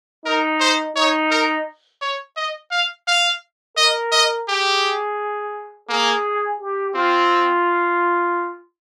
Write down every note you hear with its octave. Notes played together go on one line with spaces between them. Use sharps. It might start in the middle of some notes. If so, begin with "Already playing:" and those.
D#4 A#4
C5
D#4 C#5
A#4
C#5
D#5
F5
F5
A#4 D#5
D#5
G4 G#4
A#3 G#4
G4
C4 F4